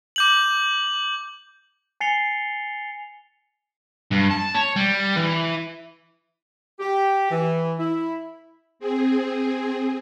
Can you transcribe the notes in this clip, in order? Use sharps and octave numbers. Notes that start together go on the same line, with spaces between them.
D6 G6 F#7
G#5 A6 C7 C#7 F7 G7
G2
A5
C#5
G3
E3
G4
E3
E4
C4 G#4